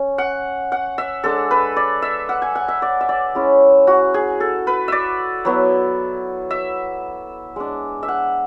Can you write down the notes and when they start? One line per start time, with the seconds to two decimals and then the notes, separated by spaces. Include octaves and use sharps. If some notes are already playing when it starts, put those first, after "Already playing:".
Already playing: C#4
0.18 F#5
0.72 F#5
0.98 E5
1.24 G#3 D4 A4
1.51 B4
1.76 D5
2.02 E5
2.29 F#5
2.42 G#5
2.55 F#5
2.68 E5
2.82 D5
3.01 E5
3.09 D5
3.35 G#3 C#4 E4
3.87 F#4
4.14 G#4
4.40 A4
4.67 B4
4.88 D5 E5
5.45 F#3 B3 E4
6.51 E5
7.56 G#3 D4
8.03 E5
8.08 F#5